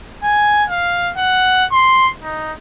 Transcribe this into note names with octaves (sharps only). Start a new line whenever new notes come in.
G#5
F5
F#5
C6
D#4